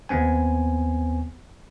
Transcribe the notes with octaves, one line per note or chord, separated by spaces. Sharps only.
D#2 B3 C4 G#5